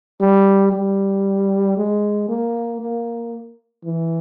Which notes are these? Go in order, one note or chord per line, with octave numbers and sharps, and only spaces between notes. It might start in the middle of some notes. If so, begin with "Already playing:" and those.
G3
G3
G#3
A#3
A#3
E3